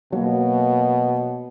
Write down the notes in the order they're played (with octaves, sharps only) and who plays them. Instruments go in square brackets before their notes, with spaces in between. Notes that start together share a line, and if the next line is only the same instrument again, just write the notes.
[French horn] B2 [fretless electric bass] F#3 [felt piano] A#3